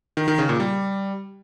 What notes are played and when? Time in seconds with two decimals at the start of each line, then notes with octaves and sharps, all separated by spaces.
0.17 D#3
0.28 D#3
0.38 C#3
0.49 A#2
0.60 G3